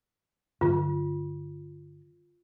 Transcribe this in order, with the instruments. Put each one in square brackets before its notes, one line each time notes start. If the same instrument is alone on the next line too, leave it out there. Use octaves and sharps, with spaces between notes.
[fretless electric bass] G2 D3 F#3 [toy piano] F4